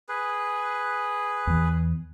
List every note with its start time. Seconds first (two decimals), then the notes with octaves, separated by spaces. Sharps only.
0.09 G#4 B4
1.47 E2 E3